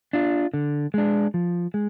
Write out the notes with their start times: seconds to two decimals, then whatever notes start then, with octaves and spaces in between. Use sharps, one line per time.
0.13 D4 F4
0.54 D3
0.94 G#3 D4
1.34 F3
1.74 G#3